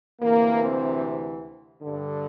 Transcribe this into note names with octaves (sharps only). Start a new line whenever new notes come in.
D2 C3 E3 A#3
C4
G2 D3